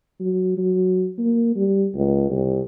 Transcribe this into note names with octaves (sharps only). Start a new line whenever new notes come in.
F#3
F#3
A#3
G3
C#2
C2